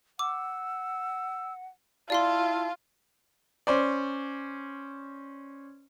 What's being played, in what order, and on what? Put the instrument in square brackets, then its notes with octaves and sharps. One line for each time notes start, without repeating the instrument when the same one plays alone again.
[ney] F#5 [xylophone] D6 [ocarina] E6
[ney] E4 [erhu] F4 [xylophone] D5 F5 C6 [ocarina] A5
[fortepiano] C#4 C5 D5